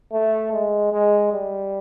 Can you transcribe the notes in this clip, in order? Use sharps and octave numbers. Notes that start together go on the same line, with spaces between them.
A3
G#3
G#3
G3